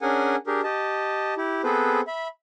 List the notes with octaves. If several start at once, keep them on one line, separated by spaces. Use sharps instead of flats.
C#4 D4 G#4 A#4 F#5 G#5
D4 G4 G#4 A#4
G4 D#5 A5
E4 G4
B3 C4 G#4 A4 B4 C5
E5 B5